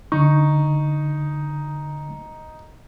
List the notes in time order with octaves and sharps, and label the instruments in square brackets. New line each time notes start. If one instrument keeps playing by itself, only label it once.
[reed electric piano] C#2 D3 C#6 [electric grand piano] D#4